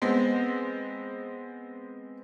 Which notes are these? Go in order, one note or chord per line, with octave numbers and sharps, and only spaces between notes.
G#3 B3 C4